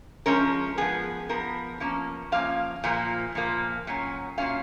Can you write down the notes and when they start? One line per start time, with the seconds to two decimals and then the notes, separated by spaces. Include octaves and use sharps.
0.26 F3 G#3 C#4 A#4
0.77 F3 B3 G#4
1.29 F3 B3 A#4
1.80 F3 A#3 C#4
2.32 F3 A#3 C#4 F5
2.84 A#2 F3 A#3
3.35 A#2 F3 A#3
3.87 A#2 F#3 C#4
4.38 A#2 F#3 C#4 F5